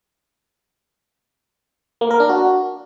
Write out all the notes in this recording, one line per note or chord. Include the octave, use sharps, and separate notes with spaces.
A#3
A#4
D4
F#4